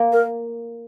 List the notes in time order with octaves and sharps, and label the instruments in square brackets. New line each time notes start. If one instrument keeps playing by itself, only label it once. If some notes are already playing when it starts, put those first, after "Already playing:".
Already playing: [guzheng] A#3
[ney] A#4